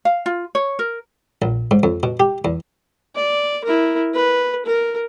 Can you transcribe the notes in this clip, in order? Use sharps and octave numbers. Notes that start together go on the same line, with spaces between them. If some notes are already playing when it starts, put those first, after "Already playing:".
F5
F4
C#5
A#4
A#1
G#2
F2
B2
G4
E2
D5
E4 A#4
B4
A#4